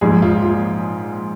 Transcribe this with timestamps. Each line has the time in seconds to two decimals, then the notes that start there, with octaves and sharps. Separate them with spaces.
0.01 A#1 G#2 F3 G#4
0.22 F4
0.42 F4